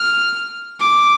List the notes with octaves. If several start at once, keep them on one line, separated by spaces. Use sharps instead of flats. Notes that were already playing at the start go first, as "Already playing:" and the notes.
Already playing: F6
D6